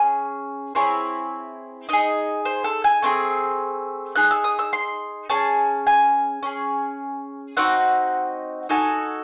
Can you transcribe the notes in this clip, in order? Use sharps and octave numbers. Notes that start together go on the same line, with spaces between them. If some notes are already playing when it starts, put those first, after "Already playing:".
Already playing: C#4 G#4
C4 E4 G#4 C#5
D#4 G#4 D#5
C5
A4
G#5
A3 C4 D#4 G#4
D#4 G#4 F#6
E6
D#6
E6
C6
C#4 G#4 A5
G#5
C#4 G#4
C4 D#4 F#4 F#5
D#4 F#4 A4 G#5